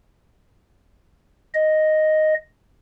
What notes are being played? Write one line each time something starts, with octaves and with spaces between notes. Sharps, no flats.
D#5